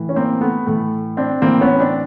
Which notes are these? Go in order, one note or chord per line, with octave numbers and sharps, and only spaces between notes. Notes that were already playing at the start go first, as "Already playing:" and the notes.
Already playing: A2 E3
C#4
A#3 C4
A3 B3
A2 E3 A3
C4 D4
A2 E3 A#3 C4
B3 C#4
C4 D4